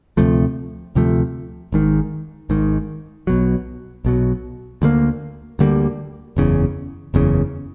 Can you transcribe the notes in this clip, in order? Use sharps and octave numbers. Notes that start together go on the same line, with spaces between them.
D2 C3 F3 A3
D2 C3 F3 A3
G#1 G#2 D#3
G#1 G#2 D#3
B1 B2 F#3
B1 B2 F#3
D2 D3 G3 A#3
D2 D3 G3 A#3
F#1 E2 C#3
F#1 E2 C#3